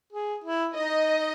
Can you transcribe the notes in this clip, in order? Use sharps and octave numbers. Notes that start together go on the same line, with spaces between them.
G#4
E4
D#4 D#5